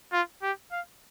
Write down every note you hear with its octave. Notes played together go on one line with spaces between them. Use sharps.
F4
G4
F5